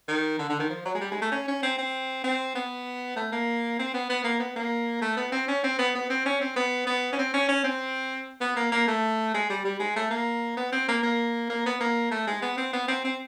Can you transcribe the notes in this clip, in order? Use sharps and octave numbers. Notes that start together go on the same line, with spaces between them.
D#3
D3
D3
D#3
F3
F#3
G#3
G3
G#3
A3
C#4
C#4
C4
C4
C4
B3
A3
A#3
C4
B3
B3
A#3
B3
A#3
A3
B3
C4
C#4
C4
B3
B3
C4
C#4
C4
B3
B3
C#4
C4
C#4
C#4
C4
B3
A#3
A#3
A3
G#3
G3
G3
G#3
A3
A#3
B3
C4
A#3
A#3
A#3
B3
A#3
A3
G#3
B3
C4
B3
C4
C4